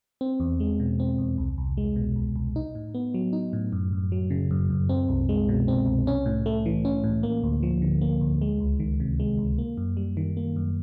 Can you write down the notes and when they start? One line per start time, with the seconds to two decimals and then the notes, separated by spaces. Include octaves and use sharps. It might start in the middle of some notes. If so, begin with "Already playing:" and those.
0.21 C4
0.40 E2
0.60 G#3
0.80 B2
1.00 C4
1.18 E2
1.38 C2
1.58 C2
1.77 G#3
1.96 B2
2.16 C2
2.36 C2
2.56 D#4
2.75 A2
2.94 B3
3.14 F#3
3.33 D#4
3.53 A2
3.73 F#2
3.93 F#2
4.12 F#3
4.30 C#3
4.51 F#2
4.70 F#2
4.89 C4
5.09 C2
5.29 G#3
5.49 B2
5.68 C4
5.87 C2
6.07 C#4
6.26 A2
6.46 A3
6.66 E3
6.85 C#4
7.04 A2
7.23 A#3
7.43 D2
7.63 F3
7.82 D3
8.01 A#3
8.21 D2
8.42 G#3
8.60 C#2
8.80 D#3
9.00 C3
9.20 G#3
9.38 C#2
9.58 A#3
9.78 F#2
9.97 G3
10.17 D#3
10.37 A#3
10.56 F#2